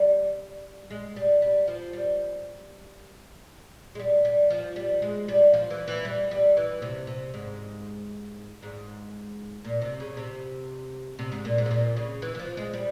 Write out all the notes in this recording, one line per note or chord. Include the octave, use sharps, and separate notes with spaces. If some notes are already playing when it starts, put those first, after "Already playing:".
Already playing: G3
G#3
G3
G3
F3
G3
G#3
G3
G3
F3
G3
G#3
G3
F3
E3
E3
G3
G3
E3
C3
C3
G#2
G#2
A#2
C3
C#3
C3
C3
G#2
A#2
G#2
C3
A#2
C#3
E3
E3
F3
G#3
G3